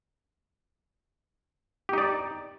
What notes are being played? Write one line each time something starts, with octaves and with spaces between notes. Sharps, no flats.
D#4 G4 D5